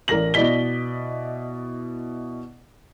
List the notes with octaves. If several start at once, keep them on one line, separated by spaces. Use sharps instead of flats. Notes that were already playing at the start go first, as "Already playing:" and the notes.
A1 A#4 D5 A#6 F#7
B2 E4 D5 D#5 B6 G7